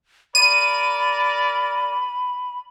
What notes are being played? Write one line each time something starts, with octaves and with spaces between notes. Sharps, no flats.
A#4 D5 B5 D#7